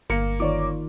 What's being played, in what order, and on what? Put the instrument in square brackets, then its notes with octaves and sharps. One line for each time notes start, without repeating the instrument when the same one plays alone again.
[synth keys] G1 [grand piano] A#3 C#7
[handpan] D#3 D#4 F4 [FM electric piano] C#5 D5 D6